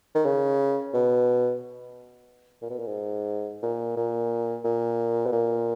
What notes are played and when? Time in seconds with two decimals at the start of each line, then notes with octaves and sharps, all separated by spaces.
0.15 D#3
0.25 C#3
0.94 B2
2.62 A#2
2.70 B2
2.79 A#2
2.87 G#2
3.63 A#2
3.97 A#2
4.64 A#2
5.26 B2
5.32 A#2